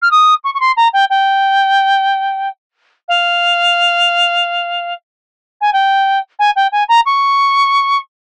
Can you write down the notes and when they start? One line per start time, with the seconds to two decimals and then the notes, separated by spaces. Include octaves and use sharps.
0.02 F6
0.11 D#6
0.44 C#6
0.54 C#6
0.60 C6
0.77 A#5
0.93 G5
1.10 G5
3.08 F5
5.61 G#5
5.73 G5
6.39 G#5
6.56 G5
6.72 G#5
6.89 A#5
7.06 C#6